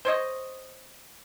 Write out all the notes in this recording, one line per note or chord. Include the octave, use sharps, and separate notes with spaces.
C5 C#5 D#5